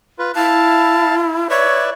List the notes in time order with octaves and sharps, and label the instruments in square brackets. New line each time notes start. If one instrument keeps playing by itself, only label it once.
[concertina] F4 B4
[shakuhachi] E4 [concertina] F5 A5
[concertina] B4 D5 E5 [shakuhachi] C#5